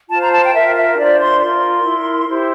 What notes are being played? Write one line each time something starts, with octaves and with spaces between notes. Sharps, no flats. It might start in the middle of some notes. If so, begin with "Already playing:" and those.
F4 C5 A5
A#5
A5
G5
F4 A#4 E5
E5
D4 F4 C5 D5
C6
F4 A#4 C6
E4 A#4
E4 G4 C5